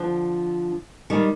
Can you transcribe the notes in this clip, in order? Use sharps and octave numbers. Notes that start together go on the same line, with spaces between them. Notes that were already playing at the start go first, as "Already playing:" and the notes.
Already playing: D3 F3
D#3 G3